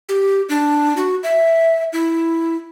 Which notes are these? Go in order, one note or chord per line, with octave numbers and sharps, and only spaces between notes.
G4
D4
F#4
E5
E4